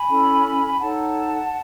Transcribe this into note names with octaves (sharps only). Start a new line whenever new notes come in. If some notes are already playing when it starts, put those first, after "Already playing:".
Already playing: G#5 B5
C#4 E4 A4
D#4 A4 C#5 F#5 A5